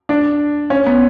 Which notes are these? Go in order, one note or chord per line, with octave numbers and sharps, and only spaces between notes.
D4
C#4
B3